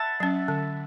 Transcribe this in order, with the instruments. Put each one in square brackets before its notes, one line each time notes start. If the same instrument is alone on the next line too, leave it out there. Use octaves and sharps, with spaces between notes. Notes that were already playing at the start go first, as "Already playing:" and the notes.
Already playing: [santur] E5 F#5 A5 B5
[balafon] F#3 C#4
D3